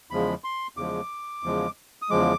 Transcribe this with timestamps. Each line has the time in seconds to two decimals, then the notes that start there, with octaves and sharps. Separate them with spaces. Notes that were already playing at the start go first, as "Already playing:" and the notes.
0.11 E2 C#3 F3 G#3 B5
0.44 C6
0.77 E2 C#3 F3 G#3 D6
1.43 E2 C#3 F3 G#3
2.02 D#6
2.10 E2 C#3 F3 G#3 D6